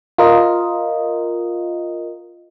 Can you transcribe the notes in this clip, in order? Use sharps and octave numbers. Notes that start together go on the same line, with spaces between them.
F4 A#4 D#5